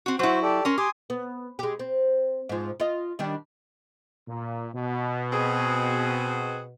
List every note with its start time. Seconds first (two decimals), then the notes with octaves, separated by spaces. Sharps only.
0.06 C4 F#4
0.19 F#3 E4 F#4 C5
0.42 G4 A4 D5
0.65 C#4 A#4 C6
0.78 G4 G#5 C6 D#6
1.10 B3
1.59 G#3 G4
1.79 C4
2.49 G#2 F3
2.80 F4 D#5
3.19 D#3 G3 D4
4.28 A#2
4.75 B2
5.31 C4 F#4 G#4